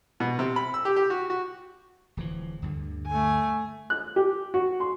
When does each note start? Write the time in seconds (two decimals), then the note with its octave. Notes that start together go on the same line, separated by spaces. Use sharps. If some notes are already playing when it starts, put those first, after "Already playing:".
0.20 B2
0.39 C3
0.56 B5
0.74 E6
0.85 G4
0.96 G4
1.10 F#4
1.30 F#4
2.17 D1 E3 F3
2.62 D2 G2 D3
3.07 A3 G#5
3.90 F#6
4.16 G4
4.54 F#4
4.80 C6